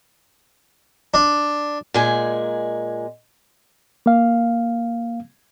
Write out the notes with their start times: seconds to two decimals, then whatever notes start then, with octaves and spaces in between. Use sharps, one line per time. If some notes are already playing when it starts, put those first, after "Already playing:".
1.14 D4
1.94 A#2 G#3 G#5
4.06 A#3 F5